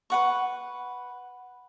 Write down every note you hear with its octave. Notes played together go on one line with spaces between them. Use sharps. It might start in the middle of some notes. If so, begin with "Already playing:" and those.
B4 F#5 C#6